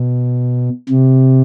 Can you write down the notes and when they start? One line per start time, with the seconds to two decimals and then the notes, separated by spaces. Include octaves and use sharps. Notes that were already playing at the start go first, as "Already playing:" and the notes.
Already playing: B2
0.89 C3